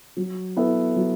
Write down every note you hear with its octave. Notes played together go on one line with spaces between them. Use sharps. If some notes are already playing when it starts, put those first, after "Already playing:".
F#3
B3 E4 A4 E5
F#3